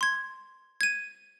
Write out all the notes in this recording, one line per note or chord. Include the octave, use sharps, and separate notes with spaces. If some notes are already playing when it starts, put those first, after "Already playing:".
C6 G#6
G#6 D#7